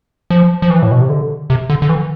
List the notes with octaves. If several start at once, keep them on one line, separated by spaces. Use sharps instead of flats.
F3
F3
E3
A2
B2
C3
D3
C3
D3
D3
E3